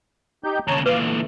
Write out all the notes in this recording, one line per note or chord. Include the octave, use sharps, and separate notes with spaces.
D#4 G4 G6
D#2 C#3 C#5 A5 A#5
A#2 E3 B4 F5 D6
D3 A3